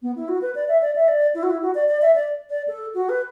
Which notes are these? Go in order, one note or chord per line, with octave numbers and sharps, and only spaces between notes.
B3
E4
F#4
B4
D5
E5
D5
E5
D5
E4
F#4
E4
F#4
D5
D5
E5
D5
D5
A4
F#4
B4